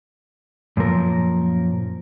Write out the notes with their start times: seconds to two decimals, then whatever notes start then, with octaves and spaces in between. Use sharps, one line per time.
0.77 F#2 A#2 F3 A#4